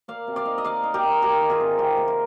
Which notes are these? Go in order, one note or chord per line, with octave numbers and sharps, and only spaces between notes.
A#3 D5 F5
C3
D5 F5
D#4
D#5
D#4 D5 F5
D#4
G4 A#4
D#4
D#3 G4 A#4
D#3
F4 G#4
C3
C3 G4
A#3
F4